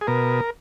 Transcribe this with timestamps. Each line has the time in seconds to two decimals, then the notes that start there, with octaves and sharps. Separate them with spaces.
0.01 G#4
0.07 B2 A#4